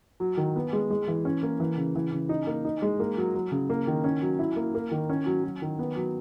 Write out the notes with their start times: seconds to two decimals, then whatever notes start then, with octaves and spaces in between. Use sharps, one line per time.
0.20 F#3
0.37 D#3
0.56 B3
0.73 G#3
0.90 G#3
1.07 E3
1.25 C#4
1.43 A#3
1.60 E3
1.77 C#3
1.95 E3
2.12 C#3
2.29 D#4
2.47 A#3
2.65 D#4
2.82 G#3
3.00 A#3
3.17 F#3
3.35 F#3
3.52 C#3
3.70 A#3
3.87 D#3
4.04 C#4
4.22 F#3
4.39 E4
4.56 A#3
4.75 A#3
4.91 D#3
5.09 C#4
5.26 F#3
5.44 F#3
5.62 D#3
5.79 B3
5.96 F#3